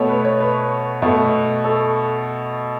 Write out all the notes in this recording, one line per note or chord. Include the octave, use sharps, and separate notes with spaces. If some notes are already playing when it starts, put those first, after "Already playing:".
Already playing: B2 A3 C#5
B4
C#5
B4
B2 A3
A4